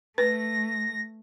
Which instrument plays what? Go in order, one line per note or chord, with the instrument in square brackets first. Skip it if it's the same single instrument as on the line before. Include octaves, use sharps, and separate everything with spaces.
[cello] A3 [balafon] B4 [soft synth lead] A#6